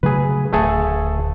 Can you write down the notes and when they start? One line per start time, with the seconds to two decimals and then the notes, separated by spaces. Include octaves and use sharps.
0.03 C#3 F#3 A3 G#4 B4
0.53 D1 A3 G#4 A4